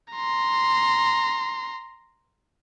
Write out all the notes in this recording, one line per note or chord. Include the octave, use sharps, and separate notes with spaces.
A#5 C6